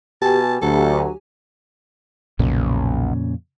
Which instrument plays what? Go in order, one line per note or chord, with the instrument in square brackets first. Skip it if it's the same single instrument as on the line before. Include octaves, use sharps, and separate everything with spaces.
[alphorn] B2 [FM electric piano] G4 G#5 [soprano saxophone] A5
[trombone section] D2 [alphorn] F#3 [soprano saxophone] A4
[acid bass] B1 [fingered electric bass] F2 A#2 C#3